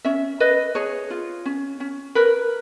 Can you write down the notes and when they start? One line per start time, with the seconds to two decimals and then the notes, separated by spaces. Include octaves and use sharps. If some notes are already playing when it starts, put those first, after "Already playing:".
0.05 C#4 E5
0.40 B4 D#5
0.75 G#4 C#5
1.10 F4
1.45 C#4
1.80 C#4
2.15 A#4 B4